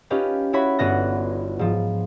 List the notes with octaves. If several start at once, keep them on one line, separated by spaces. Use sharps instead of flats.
C#4 D#4 F4 G4 B4
E4 F#4 C#5 B5
G1 B3 F#4 F#6 A#6
G#2 F3